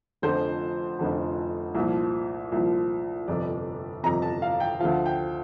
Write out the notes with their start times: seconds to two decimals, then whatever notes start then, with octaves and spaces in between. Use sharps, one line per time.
0.22 F1 F2 D3 F3 C5
0.99 F1 F2 D3 F3
1.75 C2 A#2 F3
2.52 C2 A#2 F3
3.28 G1 F2 C3 D5
4.03 G1 F2 C3 A#5
4.22 A5
4.42 F5
4.60 G5
4.80 D2 D3 F3 F5
5.06 G5